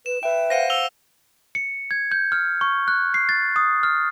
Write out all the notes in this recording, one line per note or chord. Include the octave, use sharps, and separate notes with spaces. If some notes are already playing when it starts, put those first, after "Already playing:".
B4 E7
B4 E5 G5
C5 F5 F#5 A#6 D#7
E6 F7 G7
C#7
G#6
G6
F6
C#6
F#6
C7
A6
D#6
F6